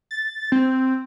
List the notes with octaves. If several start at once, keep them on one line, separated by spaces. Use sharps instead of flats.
A6
C4